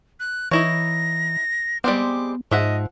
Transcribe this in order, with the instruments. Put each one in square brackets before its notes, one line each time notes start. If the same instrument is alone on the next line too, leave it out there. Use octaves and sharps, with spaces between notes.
[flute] F#6
[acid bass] E3 [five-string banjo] D#4 E4 C#5 [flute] A#6
[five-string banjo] G3 G#3 C4 [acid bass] B3 [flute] D6
[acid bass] G#2 [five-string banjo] F3 E5 F#5 [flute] D#5